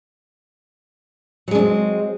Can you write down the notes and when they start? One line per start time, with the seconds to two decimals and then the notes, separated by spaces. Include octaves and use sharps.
1.48 F#3
1.51 G#3
1.55 D4
1.58 C4